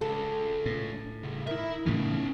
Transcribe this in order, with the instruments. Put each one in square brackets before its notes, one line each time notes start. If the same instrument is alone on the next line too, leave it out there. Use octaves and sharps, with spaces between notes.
[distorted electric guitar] C#2 [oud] A4
[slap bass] A2
[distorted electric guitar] C#3 G3
[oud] D#3 [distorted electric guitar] E4 E5
[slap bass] A2 C#3 E3 [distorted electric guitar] C#4 D#4